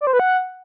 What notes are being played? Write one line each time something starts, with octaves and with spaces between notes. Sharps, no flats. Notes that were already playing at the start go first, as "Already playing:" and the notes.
D5
C5
B4
F#5